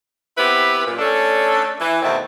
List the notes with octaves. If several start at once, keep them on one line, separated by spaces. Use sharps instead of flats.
B3 C4 E4 G4 B4
F#2 A#2
A3 C#4 D4 A4
E3
E2 B2 D#3 A3 C4